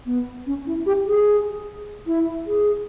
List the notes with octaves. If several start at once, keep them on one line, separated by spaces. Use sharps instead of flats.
B3
C#4
E4
G4
G#4
E4
G#4